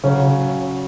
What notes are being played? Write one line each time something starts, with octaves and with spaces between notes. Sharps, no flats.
C#3 F#3 C#4 F#4